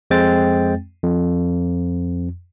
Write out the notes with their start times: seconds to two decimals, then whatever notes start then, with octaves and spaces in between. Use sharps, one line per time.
0.10 F2 G#3 C4 G5 A6
1.03 F2